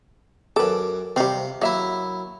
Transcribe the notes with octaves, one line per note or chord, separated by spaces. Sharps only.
F#2 A4 B4 D6
C3 G3 C4 F5
F#3 A#3 E4 E5